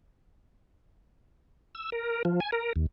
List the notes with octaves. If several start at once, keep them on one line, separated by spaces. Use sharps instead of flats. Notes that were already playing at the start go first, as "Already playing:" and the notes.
E6
A#4
F3
G#5
A#4
D#2